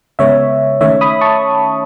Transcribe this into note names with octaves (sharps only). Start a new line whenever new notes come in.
C#3 G#3 B3 C#5 E5
D#3 A3 C#4 C#5 E5
B5 D#6
A5 C#6